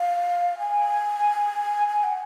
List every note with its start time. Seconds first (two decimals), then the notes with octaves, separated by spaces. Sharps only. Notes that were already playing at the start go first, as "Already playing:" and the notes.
Already playing: F5
0.58 G#5
1.88 G#5
2.03 F#5